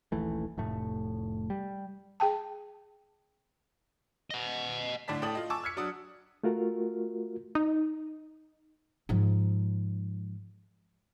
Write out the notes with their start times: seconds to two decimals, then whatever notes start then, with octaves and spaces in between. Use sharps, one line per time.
0.12 D#1 A#1 E3 A3
0.58 F1 A2 A3
1.50 G3
2.20 G#4 G5 A5
4.31 D#5 F#5
5.08 A2 D3 D5 A5 B6
5.22 A2 A4 D5 G5 D#6 F#7
5.35 F4 D#5
5.50 G#5 A5 C#6 D6 E6
5.64 F6 G#6 B6 C#7
5.77 F#3 D4 F#4 D#6
6.43 A3 F4 F#4 A#4
7.55 D#4
9.09 G#2 F3